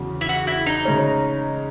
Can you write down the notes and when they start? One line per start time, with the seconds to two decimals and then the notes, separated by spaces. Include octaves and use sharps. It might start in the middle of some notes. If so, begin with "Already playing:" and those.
Already playing: E2 C#3 F#3
0.21 E4
0.29 F#4
0.47 E4
0.66 D#4
0.85 C#3 G#3 C#4